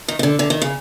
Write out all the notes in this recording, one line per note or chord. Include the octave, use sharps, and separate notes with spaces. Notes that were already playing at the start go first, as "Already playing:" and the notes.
D#3
D#3
D3
D3
D#3
C#3